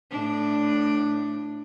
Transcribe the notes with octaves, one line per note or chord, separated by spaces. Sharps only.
A2 D4